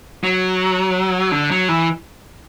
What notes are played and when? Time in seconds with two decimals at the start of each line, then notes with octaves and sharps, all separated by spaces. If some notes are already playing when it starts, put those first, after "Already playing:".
0.23 F#3
1.32 D3
1.51 F#3
1.68 E3